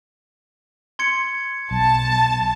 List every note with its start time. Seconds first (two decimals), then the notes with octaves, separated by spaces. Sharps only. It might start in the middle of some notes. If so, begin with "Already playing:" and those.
0.99 C6 G#6 C#7
1.71 B1 A5